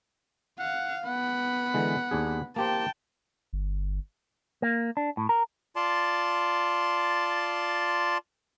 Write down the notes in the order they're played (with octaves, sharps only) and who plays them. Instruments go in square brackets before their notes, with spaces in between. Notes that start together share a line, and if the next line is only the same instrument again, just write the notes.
[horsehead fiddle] F5 [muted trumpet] F#5
[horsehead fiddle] B3 B5 [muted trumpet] F#5
[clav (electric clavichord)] D3 E3 G#3
D#2 D4 G#4
[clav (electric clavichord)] A#3 G4 C5 [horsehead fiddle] G5 A5
[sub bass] G1
[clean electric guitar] A#3
D4
A2
A#4
[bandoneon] F4 D5 A5 C6